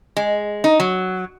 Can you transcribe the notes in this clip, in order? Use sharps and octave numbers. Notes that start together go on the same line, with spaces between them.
G#3
D#4
F#3